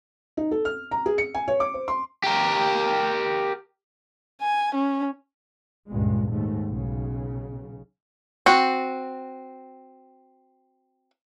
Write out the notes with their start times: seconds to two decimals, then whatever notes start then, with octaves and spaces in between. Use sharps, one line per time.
0.37 D#4
0.51 A4
0.65 F6
0.91 A#5
1.06 G#4
1.18 C#7
1.34 G#5
1.48 C#5
1.60 D6
1.74 C5
1.88 C6
2.23 G4 A#4
4.42 G#5
4.75 C#4
5.88 C#2 G2 A#2 G#3
6.30 D#2 G#2 A3
6.67 B1 C#3
8.46 C4 F#4